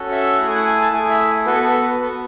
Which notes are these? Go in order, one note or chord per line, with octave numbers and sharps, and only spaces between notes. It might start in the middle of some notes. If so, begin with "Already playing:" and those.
Already playing: C#4 F#4 A4
E5
A3 E4 G#4 F#5
G#5
F#5
G#5
A5
A3 E4 G#4 G#5
E5
B3 F#4 A4 B4
A4
B4
B3 F#4 A4